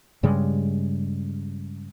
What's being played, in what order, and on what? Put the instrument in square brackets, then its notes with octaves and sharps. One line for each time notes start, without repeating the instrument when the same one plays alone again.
[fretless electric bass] G2 C#3 G3 G#3